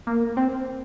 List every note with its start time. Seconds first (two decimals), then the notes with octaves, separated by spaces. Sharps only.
0.07 A#3
0.37 C4